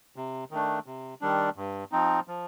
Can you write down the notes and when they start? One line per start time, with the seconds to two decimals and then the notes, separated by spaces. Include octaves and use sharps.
0.16 C3
0.51 D#3 A3 D4
0.86 C3
1.21 D#3 G3 D4
1.56 G2
1.92 F3 C4 D#4
2.28 F3